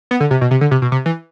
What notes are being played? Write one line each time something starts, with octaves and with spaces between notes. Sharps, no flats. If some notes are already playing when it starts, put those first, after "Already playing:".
B3
D3
C3
B2
C3
D3
C3
B2
C3
E3